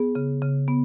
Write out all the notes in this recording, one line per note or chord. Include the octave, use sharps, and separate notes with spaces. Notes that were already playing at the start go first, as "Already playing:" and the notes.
Already playing: B3 G#4
C#3
C#3
B3